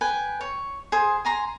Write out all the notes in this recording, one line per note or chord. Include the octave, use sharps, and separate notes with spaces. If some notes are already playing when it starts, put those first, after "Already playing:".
B4 G5 G#5
C#5
G#4 C5
G#5 A#5 C6